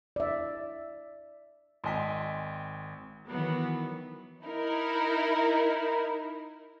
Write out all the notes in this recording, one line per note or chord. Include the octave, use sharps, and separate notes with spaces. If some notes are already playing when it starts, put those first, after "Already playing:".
D5 E5
G#1 D#5 G5 G#5 C6 B6
D#3 E3 F#3 B3
D#4 E4 A#4